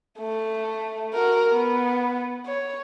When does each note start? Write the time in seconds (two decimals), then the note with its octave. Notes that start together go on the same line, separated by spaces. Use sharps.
0.19 A3
1.14 F#4 A#4
1.51 B3
2.46 C#5